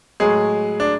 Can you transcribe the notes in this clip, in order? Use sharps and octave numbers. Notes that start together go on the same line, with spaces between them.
A2 F#3 G#3 G#4
D4